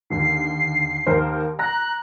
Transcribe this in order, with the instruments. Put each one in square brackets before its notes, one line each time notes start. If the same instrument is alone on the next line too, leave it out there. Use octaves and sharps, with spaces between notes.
[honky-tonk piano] D#2 D3 [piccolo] C7
[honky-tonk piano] D#2 A#4 C5
[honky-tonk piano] A#5 A#6 [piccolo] F#6